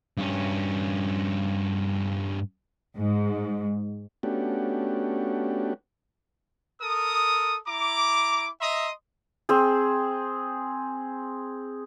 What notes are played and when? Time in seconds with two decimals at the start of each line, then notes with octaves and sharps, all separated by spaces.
0.17 G2 C#4
2.97 G#2
4.23 A3 B3 C#4 D4 F#4 G4
6.81 A4 A#4 D#6
7.67 E4 A#5 D6
8.60 D#5 E5 A#5 C6 D#6
9.49 C4 G#4